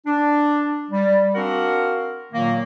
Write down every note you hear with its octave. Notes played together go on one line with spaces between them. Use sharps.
D4
G3
C4 D4 F#4 A#4 F5 F#5
A#2 D#3 F#3 A#3